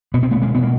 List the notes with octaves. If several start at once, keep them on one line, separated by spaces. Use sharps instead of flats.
B2 B3
C4
A3 B3
G#3 A#3
B2 B3
A#3